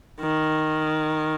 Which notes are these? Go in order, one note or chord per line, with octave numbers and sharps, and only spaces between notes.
D#3